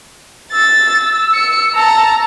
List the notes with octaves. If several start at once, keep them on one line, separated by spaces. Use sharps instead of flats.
E6 A6
C#7
A5 A#5